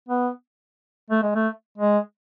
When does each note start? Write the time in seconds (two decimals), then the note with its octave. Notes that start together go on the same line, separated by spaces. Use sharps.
0.09 B3
1.10 A3
1.22 G#3
1.35 A3
1.78 G#3